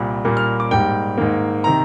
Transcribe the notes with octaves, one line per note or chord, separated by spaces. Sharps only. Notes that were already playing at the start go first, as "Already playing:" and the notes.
Already playing: C2 A#2 G3
A#2 G3 A#3
F6
D6
G#2 G3 A#3 G5
G#2 D#3 A#3
C3 D#3 A#5